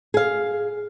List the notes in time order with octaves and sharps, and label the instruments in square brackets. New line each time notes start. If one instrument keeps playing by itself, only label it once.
[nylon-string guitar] G#4 F5